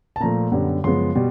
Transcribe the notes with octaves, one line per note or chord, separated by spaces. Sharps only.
A5
A#2 F3 A3 A#5
F#2 D3 G3 B3
F#2 C#3 F3 G#3 B3 C6
B2 G3